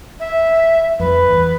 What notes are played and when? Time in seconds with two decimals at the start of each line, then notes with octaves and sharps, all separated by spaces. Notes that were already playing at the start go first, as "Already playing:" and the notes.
0.20 E5
0.99 F2 B4
1.31 E2